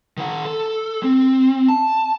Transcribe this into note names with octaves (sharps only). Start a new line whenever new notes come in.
D#3 F#5
A4
C4
A5